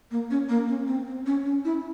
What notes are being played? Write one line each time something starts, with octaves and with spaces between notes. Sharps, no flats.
A#3
C#4
A#3
C#4
C4
C4
C#4
C#4
E4